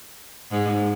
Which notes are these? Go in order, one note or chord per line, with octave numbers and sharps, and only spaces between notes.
G#2